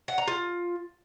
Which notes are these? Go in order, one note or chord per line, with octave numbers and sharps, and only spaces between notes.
F#5
A#5
F4